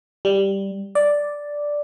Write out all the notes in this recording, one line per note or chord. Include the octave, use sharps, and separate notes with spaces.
G3
D5